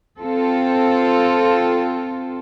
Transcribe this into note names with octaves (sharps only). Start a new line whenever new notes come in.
C4 F4 A4